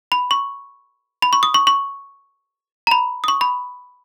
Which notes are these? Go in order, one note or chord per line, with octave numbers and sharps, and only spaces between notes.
B5
C#6
B5
C#6
D#6
C#6
C#6
A#5
B5
D#6
C#6
B5